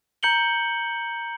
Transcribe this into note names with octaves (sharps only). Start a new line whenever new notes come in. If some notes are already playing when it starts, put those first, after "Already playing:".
A#5 G6 C#7 F#7 G7